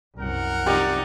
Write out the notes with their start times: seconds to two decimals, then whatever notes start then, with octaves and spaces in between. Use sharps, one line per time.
0.19 C2 F#2 A#4 F#5
0.66 C3 F3 D#4 G4 D5